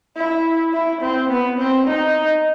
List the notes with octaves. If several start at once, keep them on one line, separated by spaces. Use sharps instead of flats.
E4
E4
C4
B3
C4
D#4